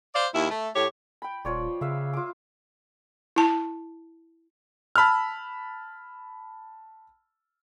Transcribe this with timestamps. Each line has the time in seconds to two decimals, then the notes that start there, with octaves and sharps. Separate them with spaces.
0.15 C5 D5 F5
0.33 D#2 E4
0.50 A3
0.74 A2 G4 C#5
1.22 G5 B5
1.45 D#1 F3 C#5 D5
1.81 C#3 B4 E5 F5
2.13 F4 D6
3.36 E4 A5
4.96 A5 B5 E6 F6